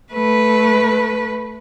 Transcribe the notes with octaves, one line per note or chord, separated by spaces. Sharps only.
A3 B4